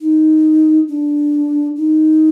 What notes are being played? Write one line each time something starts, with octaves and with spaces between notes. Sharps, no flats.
D#4
D4
D#4